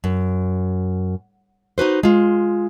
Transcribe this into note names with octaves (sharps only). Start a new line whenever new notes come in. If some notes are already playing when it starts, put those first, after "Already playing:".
F#2
D#4 F#4 B4 C5
G#3 F4